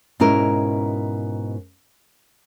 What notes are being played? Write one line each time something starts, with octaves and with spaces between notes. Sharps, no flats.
G#2 B2 C#4 E4 A#4